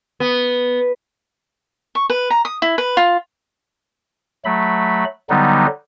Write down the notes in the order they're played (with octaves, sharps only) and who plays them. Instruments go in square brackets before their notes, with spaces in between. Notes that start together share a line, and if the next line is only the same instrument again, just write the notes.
[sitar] B3
[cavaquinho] C#6
B4
A#5
D#6
E4
B4
F4
[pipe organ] F#3 A3 B5
D3 F#3 G3 B3 D#4